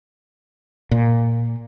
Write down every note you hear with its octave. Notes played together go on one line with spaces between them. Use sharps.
A#2